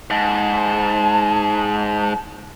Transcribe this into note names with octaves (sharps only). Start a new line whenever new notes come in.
G#2 A5